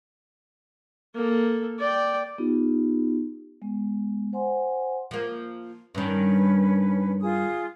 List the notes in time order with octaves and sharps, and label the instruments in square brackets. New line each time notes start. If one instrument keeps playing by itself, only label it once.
[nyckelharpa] A#3 A4
D5 G5
[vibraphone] B3 D#4 F4 G4
G#3 B3
C5 F#5 G#5 C6
[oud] F3 A#3
[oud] G2 D#3 [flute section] C#4 B4
[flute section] F4 G#4 D#6